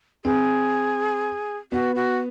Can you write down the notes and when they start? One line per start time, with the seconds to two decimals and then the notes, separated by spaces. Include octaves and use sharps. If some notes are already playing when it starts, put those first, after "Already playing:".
0.25 C4 G#4
1.72 B3 F#4
1.95 F#4